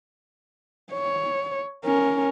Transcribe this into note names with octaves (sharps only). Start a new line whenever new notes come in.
C#5
C#4 A#4